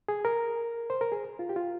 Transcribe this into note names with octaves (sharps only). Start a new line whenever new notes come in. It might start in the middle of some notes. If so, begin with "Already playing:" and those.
G#4
A#4
C5
A#4
G#4
F4
G4
F4